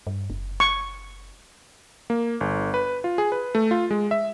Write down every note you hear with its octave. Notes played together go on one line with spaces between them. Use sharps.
G2
F#1
C#6
A#3
G1
B4
F4
G#4
B4
A3
F4
G#3
E5